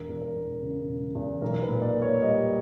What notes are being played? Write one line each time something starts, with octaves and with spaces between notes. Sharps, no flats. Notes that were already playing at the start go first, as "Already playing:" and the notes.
Already playing: E1 A#4
E2
A#4
E1
C#3
E1
E2
B1 A#4
B4
A#2
D5
A#3
C#5
G3 D#5